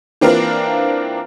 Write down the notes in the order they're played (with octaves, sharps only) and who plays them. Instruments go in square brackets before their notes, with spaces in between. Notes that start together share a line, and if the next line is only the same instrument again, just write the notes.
[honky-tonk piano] E3 A#3 C4 D4 F4 A#4